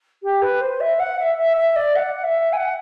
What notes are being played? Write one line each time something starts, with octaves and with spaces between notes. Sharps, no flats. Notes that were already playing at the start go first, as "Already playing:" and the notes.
G4
B4
C5
E5
F#5
E5
E5
E5
D5
F#5
E5
G#5
F#5